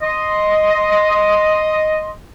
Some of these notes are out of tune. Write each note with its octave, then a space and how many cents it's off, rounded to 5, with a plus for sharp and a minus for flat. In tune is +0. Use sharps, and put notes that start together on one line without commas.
D#5 +0 C6 +0